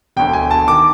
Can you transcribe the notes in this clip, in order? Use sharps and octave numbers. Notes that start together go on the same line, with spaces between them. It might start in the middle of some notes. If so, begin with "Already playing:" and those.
E1 D2 D3 G5
G#5
A5
D#3 D6